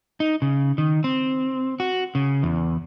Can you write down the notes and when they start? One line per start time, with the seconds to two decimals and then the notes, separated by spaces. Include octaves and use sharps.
0.20 D#4
0.42 C#3
0.78 D#3
1.04 C4
1.80 F#4
2.15 C#3
2.43 E2